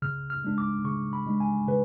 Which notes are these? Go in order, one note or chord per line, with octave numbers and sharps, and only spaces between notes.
C#3 F6
F6
G#3 D4
D6
C#3 C#6
B5
G#3 D4
G#5
C#3 B4